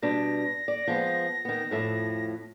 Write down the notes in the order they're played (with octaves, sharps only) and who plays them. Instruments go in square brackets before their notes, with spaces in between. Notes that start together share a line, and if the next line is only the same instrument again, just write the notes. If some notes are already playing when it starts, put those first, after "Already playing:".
[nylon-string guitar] B2 G3 D4 [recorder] A#6
[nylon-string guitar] D5
F3 G#3 B3
D#3 B3
F2 A2 E5